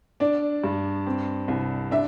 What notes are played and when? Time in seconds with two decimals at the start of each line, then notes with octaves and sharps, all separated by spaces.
0.20 D4 D5
0.64 G2
1.06 C4
1.48 C2
1.91 D4 E5